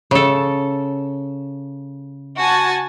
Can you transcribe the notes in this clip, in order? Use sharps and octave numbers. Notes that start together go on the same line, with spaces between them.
C#3 A4
F#4 G#5 A5